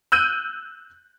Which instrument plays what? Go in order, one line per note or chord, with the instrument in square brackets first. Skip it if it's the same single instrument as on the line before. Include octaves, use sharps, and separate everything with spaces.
[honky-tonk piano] E6 F#6 G6 D#7